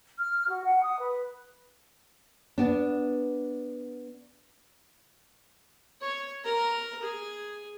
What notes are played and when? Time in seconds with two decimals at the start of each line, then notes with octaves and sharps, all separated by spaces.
0.17 F6
0.48 F#4
0.64 F#5
0.82 D#6
0.98 B4
2.58 B3 D4
6.01 C#5
6.44 A#4 A#5
7.03 G#4